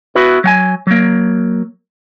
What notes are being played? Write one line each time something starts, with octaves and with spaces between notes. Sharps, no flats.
B3 E4 F#4 B4
F#3 F#5 G#5
F#3 A#3